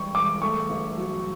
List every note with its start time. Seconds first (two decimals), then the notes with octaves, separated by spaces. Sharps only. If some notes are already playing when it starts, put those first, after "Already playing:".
Already playing: E1 G3 C#6
0.14 E1 D6
0.42 A3 C#6
0.69 G1
0.97 F#3